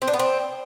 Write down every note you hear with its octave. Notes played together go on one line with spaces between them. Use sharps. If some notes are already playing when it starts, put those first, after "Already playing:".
C4
D4
B3
C4